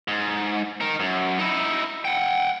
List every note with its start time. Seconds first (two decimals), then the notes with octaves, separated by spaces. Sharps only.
0.08 G#2
0.81 D#4 A#4
1.00 F#2
1.39 D#4 E4
2.05 F#5 G5